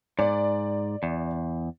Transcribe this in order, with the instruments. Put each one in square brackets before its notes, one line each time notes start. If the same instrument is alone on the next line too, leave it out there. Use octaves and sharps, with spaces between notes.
[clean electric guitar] G#2 [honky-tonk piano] D5
[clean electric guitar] E2